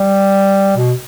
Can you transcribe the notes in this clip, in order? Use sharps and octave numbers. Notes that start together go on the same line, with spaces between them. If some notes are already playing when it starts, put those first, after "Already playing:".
Already playing: G3
B2